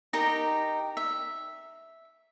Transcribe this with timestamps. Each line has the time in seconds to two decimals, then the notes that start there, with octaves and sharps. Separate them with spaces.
0.13 D#4 G4 A#4 A#5
0.97 E5